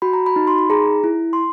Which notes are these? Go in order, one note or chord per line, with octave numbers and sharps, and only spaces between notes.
F#4 B5
A#5
B5
D#4
C6
B5
G#4 A#5
E4
C6